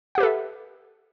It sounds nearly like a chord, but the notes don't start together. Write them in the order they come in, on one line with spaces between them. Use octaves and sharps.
F#5 G4 B4 A4 E5